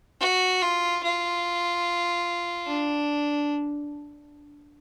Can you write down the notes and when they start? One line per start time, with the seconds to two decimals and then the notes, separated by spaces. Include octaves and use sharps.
0.21 F#4
0.62 F4
1.03 F4
2.66 D4